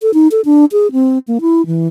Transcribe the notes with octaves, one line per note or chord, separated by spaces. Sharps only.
A4
D#4
A4
D4
G#4
C4
A#3
E4
E3